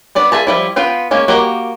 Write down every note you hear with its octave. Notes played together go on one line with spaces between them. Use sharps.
B3 D4 D5
F4 G#4 E5 A5 A#5
F3 G3 E4
B3 F4 F5 G5
G#3 A#3 C#4
A#3 F#4 G4 D#5 A#5